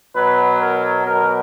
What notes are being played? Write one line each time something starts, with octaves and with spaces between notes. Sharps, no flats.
B2 F#3 B4
A#4
B2 F#3 A#4